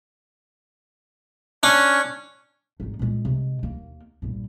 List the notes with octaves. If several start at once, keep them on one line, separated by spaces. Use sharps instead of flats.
C#4 D4
G#1 D#4
A#2 G#3
C3 G#3
D#2 A#3
A#1 G2